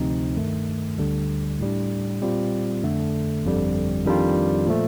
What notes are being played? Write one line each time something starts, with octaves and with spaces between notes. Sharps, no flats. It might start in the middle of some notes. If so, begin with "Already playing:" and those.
Already playing: D2 C3 F3 C4 D#4
G2 D#3 A3
D2 D3 G3
A2 G3 D4
A#2 G3 C4 F4
F2 D3 A3
G1 F2 D3 G3
F2 D#3 G3 D4 F4
A#2 F3 A3